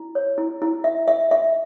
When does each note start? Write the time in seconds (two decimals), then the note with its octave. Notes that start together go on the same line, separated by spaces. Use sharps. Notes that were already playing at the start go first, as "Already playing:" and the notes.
Already playing: E4
0.15 C#5
0.38 E4
0.62 E4
0.84 E5
1.08 E5
1.31 E5